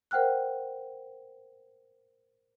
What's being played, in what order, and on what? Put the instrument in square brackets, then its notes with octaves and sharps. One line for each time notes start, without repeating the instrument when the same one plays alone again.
[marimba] A#4 C5 F#5 G5 F6 F#6